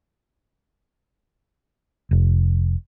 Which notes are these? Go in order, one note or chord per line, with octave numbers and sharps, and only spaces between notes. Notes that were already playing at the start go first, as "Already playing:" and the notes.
F1